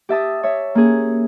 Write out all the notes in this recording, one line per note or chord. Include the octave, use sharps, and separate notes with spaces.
G4 E5 A5 D#6
C#5 E5
A#3 C#4 G#4